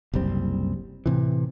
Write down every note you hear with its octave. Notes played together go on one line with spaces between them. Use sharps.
F#1 C2 G3 C4
A2 C3 E3